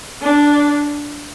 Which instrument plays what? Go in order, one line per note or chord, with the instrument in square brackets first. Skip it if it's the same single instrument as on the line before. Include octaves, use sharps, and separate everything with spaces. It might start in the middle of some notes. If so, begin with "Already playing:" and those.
[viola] D4